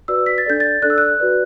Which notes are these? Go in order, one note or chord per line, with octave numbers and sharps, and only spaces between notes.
F#4 B4 D5 E6
B6
A6
D4 A4 D5 G6
A6
D4 A4 D5 F#6
E6
F#6
F#4 B4 D5